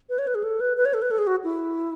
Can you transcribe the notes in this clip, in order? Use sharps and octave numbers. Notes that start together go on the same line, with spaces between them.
B4
C#5
B4
G#4
A4
B4
B4
C#5
A4
B4
A4
G#4
F#4
E4